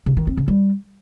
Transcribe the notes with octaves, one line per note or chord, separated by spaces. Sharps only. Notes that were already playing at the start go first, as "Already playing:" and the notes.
C#3
D#3
C4
C#3
G3